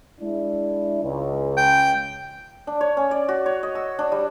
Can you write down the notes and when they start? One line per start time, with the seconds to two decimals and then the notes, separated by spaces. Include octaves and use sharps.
0.20 G#3 D4 E4
1.03 C#2
1.57 G5
2.67 D4
2.81 C#5
2.97 C#4
3.11 D5
3.29 F#4
3.46 C#5
3.63 D#5
3.75 E6
3.99 D4
4.12 G3